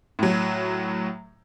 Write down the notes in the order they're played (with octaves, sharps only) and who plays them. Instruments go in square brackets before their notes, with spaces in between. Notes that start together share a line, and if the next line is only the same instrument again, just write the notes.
[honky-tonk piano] A2 F#3